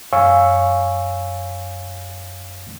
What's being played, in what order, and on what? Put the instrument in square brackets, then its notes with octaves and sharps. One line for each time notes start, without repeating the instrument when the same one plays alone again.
[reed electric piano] F#2 C#5 F5 G#5 C#6 E6